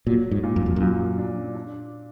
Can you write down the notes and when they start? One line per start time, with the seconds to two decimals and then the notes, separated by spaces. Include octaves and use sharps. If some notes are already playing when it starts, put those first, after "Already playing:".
0.07 A#2 F#3
0.31 G#2
0.43 A#2
0.56 F#2
0.66 F2
0.76 F#2 A#2
1.18 D4
1.55 D4